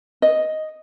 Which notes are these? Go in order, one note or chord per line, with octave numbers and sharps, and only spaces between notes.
D#5